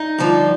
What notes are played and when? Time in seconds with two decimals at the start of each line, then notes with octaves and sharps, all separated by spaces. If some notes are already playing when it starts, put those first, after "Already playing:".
Already playing: D#4
0.18 G2 D3 F3